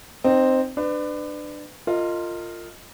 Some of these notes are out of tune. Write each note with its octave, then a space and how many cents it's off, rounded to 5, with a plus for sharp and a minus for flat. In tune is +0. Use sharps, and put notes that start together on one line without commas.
C4 +0 D#4 -20
D4 +25 B4 +30
F4 +0 A#4 -35 D#5 +0